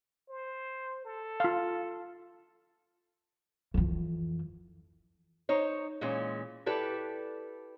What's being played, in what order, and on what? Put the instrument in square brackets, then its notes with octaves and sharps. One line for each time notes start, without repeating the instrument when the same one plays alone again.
[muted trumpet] C5
A4
[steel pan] F4 F5
[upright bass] F2 E3
[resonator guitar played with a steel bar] D#4 C5 C#5
A#2 E3 G#3 C#4
E4 G4 A4 B4 D5